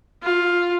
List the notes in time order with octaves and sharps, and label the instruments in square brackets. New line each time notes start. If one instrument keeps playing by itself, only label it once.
[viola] F4